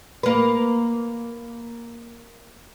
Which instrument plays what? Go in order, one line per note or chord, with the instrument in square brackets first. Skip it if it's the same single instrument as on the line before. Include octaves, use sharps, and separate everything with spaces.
[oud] A#3 B4